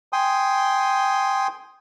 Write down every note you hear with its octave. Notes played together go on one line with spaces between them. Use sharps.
G5 G#5 C6 D#6